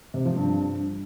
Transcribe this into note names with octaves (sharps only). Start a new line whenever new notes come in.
C3
F3
G2